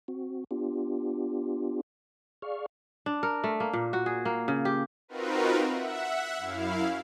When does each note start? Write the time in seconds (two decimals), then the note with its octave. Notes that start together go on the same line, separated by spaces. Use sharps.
0.08 C4 F#4
0.51 B3 D4 F4 G4
2.42 G#4 D5 F5 C#6 F6
3.06 D4
3.23 A#4
3.44 A3
3.60 A#3
3.73 A#2
3.93 F#4
4.06 G#4
4.25 A#3
4.48 C#3
4.65 G4
5.08 C4 D#4 F4 F#4 A#4 B4
5.71 E5 F#5
6.37 F#2 E4 F5